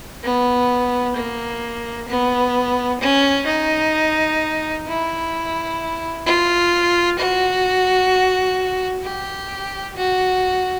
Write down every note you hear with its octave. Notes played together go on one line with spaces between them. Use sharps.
B3
A#3
B3
C#4
D#4
E4
F4
F#4
G4
F#4